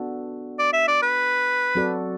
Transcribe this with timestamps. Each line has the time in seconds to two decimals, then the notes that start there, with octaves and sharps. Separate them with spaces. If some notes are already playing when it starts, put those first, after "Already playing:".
Already playing: B3 D4 F#4 A4
0.59 D5
0.73 E5
0.88 D5
1.02 B4
1.75 F#3 C4 F#4 A4 D5